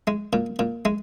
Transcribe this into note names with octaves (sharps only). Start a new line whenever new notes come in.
G#3
A#2
A#2
G#3